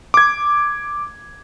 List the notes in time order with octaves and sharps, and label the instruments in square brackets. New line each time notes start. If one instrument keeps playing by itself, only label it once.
[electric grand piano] D6 G#6